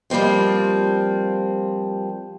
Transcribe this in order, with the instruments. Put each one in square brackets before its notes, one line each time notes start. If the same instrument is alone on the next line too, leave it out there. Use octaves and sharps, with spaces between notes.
[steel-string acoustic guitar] F3 G3 A#3 C4 F4